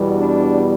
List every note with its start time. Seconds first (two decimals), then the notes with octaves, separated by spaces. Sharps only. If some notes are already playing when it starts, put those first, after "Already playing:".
Already playing: E2 B2 G3
0.18 D4